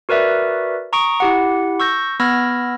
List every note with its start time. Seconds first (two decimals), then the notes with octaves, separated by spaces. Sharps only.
0.09 F#4 A#4 B4 D5 E5
0.93 A#5 C#6 D#6 D7
1.20 E4 G4 F#5
1.80 C#6 E6 G6 A#6
2.20 B3 B5 E6 F6 G#6 A#6